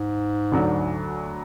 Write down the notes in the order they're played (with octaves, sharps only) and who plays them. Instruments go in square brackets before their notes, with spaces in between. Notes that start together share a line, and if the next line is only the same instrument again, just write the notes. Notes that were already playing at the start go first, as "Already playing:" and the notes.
Already playing: [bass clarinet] G#2
[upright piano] D2 D3 F#3 D4